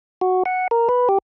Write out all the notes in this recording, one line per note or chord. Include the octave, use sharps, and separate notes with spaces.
F#4
F#5
A#4
B4
G4